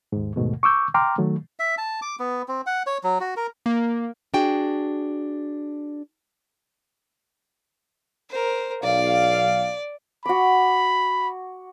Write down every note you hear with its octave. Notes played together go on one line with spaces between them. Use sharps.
D#2 G#2
D#2 G#2 B2 A3
C#6 D6 E6 G6
G5 A#5 C6 D6 F6
D#3 F#3 A3
E5
A5
D6
B3
C4
F#5
C#5
F#3
F#4
A#4
A#3
D4 F#4 G#4 G5
A#4 C5
B1 D5 F5
F#4 B5 D6